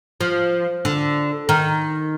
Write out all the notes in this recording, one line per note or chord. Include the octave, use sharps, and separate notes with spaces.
F3
D3
D#3